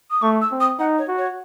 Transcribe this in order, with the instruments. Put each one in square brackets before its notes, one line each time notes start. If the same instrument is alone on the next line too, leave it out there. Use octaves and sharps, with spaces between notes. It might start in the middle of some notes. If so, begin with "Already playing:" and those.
[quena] D#6
[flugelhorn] A3 [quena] C#6
[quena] E6
[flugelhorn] C4
[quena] D#6
[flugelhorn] D#4 [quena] F#5
[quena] C#5
[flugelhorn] F#4
[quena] C#5